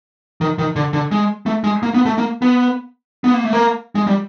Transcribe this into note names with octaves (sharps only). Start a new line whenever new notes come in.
D#3
D#3
D3
D3
G#3
A3
G#3
A#3
B3
A3
A#3
B3
B3
A#3
A3
A#3
G#3
G3